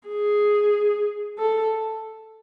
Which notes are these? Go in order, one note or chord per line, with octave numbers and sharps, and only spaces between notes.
G#4
A4